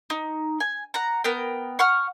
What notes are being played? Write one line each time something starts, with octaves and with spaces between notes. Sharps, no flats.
D#4
G#5
F#5 A#5
B3 A#4 G5
F#5 C#6 F6